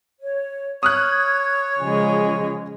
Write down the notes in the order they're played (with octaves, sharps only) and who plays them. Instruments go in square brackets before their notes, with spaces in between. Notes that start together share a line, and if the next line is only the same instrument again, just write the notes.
[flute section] C#5
[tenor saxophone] C#5 [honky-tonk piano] D#6 F6 F#6 [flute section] G#6
[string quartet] C#3 F3 G#3 [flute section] G#5